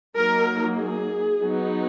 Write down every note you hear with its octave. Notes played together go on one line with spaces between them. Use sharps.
F#3 A#3 D#4 A#4
G#4
F#3 B3 D#4